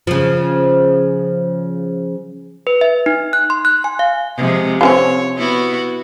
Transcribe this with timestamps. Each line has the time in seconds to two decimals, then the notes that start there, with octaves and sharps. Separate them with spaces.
0.07 C#3 F3
2.67 B4
2.81 E5
3.06 D#4
3.33 F#6
3.50 C6
3.65 F#6
3.84 G#5
3.99 F5
4.37 C3 F3 G#3
4.81 C4 C#4 F4 C#5
5.37 B3 E4 F#4